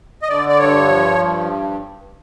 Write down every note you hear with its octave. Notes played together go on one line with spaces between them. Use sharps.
D#5
D3 D5
D5
G2 C#5
F3
G2